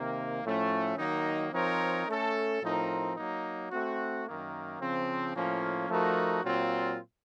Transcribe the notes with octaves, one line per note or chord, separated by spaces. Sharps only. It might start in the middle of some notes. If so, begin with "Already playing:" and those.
Already playing: C3 D#3 A#3
A2 F3 A3 C#4
D#3 F#3 A#3 D#4
F3 C4 D#4 A#4 C#5
A3 C#4 A4
A2 F3 C4 D#4 A#4
F#3 A#3 D#4
A3 C4 F#4
F#2 D#3 A#3
C#3 F3 C4
A2 F3 A#3 C#4
F3 A3 D#4 F#4 A#4
A#2 F#3 C4 F4